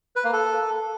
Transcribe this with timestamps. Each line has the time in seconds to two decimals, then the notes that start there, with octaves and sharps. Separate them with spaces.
0.16 B4
0.24 A#3
0.33 A4